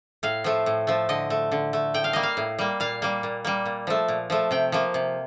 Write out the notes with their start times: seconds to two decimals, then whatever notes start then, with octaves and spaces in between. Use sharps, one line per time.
0.23 A2 F5
0.44 F3 A3
0.66 A2
0.87 F3 A3
1.09 D3 D#5
1.30 A3
1.51 D3
1.73 A3
1.94 A2 G5
2.04 F5
2.13 G3 A#3 D#5
2.23 F5
2.37 A2
2.59 G3 A#3
2.80 A#2 F5
3.02 G3 A#3
3.23 A#2
3.45 G3 A#3
3.66 A#2
3.87 F3 A3
4.08 A#2
4.30 F3 A3
4.51 C3 G5
4.72 F3 A#3
4.94 C3